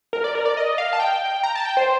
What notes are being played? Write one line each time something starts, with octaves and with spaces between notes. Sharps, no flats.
A#4
D5
A#4
D5
D#5
F5
A5
G5
A#5
A5
G5
C5